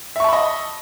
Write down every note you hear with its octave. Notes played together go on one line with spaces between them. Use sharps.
D#5 E5 A5 B5 C#6